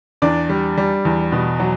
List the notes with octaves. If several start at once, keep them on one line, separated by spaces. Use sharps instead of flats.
E2 D4 D5
G3
G3
E2
B2
F#3